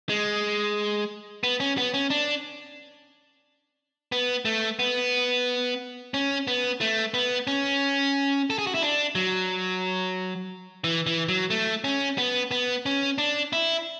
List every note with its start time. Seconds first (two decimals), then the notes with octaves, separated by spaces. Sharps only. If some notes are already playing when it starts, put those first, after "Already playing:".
0.09 G#3
1.44 B3
1.60 C#4
1.78 B3
1.94 C#4
2.10 D4
4.12 B3
4.45 A3
4.79 B3
6.14 C#4
6.47 B3
6.81 A3
7.14 B3
7.47 C#4
8.50 A4
8.58 G#4
8.67 F#4
8.74 E4
8.82 D4
9.15 F#3
10.84 E3
11.06 E3
11.28 F#3
11.50 A3
11.84 C#4
12.18 B3
12.51 B3
12.86 C#4
13.18 D4
13.53 E4